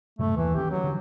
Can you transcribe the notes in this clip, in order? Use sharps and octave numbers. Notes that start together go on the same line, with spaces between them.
F#2 A2 C3 A3
D#2 E3
D#3 E3 C#4 G4
F#3
D3 E3